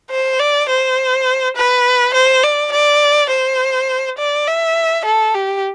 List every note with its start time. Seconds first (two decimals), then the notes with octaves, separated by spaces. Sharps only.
0.11 C5
0.40 D5
0.69 C5
1.56 B4
2.14 C5
2.43 D5
2.72 D5
3.31 C5
4.18 D5
4.47 E5
5.05 A4
5.35 G4